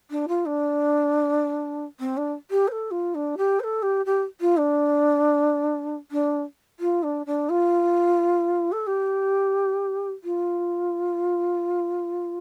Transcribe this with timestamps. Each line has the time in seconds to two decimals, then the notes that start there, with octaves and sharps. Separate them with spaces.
0.10 D4
0.28 F4
0.46 D4
1.99 C4
2.17 D4
2.51 G4
2.68 C5
2.72 A4
2.91 F4
3.15 D4
3.37 G4
3.60 C5
3.63 A4
3.82 G4
4.05 G4
4.41 F4
4.57 D4
6.11 D4
6.80 F4
7.03 D4
7.26 D4
7.49 F4
8.72 A4
8.87 G4
10.24 F4